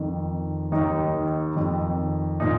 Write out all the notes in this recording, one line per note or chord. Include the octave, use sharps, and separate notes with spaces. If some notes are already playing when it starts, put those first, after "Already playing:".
Already playing: F2 D#3
D#2 D#3 D#4
F2 D#3
A#2 D#4